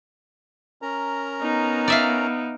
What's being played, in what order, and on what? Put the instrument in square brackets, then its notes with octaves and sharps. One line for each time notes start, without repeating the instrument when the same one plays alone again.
[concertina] C#4 A#4 A#5
[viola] B3 D#4
[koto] D5 E5 F5